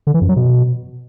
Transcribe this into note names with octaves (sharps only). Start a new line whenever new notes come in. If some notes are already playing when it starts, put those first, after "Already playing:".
D3
E3
F#2
F#3
B2